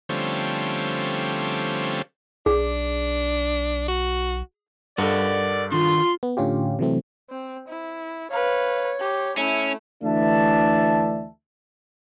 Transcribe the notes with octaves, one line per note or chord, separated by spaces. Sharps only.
D3 F3 G3 A3 C4 C#4
B1 D4 G#4
F#4
G2 A4 A#4 D5 D#5 F#5
D#3 D4 F4 C6
B3
A2 D3 C#4 F4 G4
C3 E3 F#3 A3 C4
C4
E4
B4 C#5 F5
G4
A3 C#4 E4
D2 E3 A3 D4 E5 A5